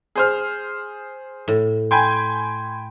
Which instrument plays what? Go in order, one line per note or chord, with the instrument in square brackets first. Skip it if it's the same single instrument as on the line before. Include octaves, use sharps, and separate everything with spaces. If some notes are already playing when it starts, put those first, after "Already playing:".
[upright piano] G#4 C5 F6
[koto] A2
[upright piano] G5 G#5 B5 [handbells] C6 G6 G#6